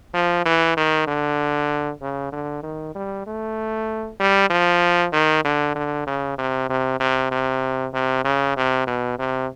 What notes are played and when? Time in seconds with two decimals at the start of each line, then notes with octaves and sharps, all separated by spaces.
0.14 F3
0.45 E3
0.77 D#3
1.07 D3
2.02 C#3
2.32 D3
2.63 D#3
2.95 G3
3.27 A3
4.20 G3
4.50 F3
5.13 D#3
5.45 D3
5.75 D3
6.07 C#3
6.38 C3
6.69 C3
7.00 C3
7.31 C3
7.93 C3
8.24 C#3
8.57 C3
8.87 B2
9.19 C3